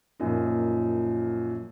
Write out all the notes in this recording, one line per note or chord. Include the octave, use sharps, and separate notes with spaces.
F#2 A#2 F3 D#4